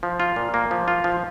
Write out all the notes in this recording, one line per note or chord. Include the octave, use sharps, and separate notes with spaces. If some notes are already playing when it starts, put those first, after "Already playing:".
F3
F4
A#2
A#3
F3
F4
F3